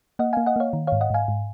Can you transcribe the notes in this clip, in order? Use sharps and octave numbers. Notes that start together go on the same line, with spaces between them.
A#3 D#5 F#5
A#3 F5 G#5
D#5 F#5
A#3 C#5 F5
D#3
G#2 C#5 F5
D#5 F#5
G#2 F5 G#5
G#2